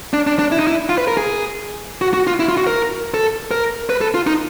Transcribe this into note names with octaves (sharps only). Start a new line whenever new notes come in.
D4
D4
D4
E4
D#4
E4
F4
B4
A#4
G#4
F#4
F#4
F4
E4
F4
F#4
A#4
A4
A#4
B4
A4
F4
D#4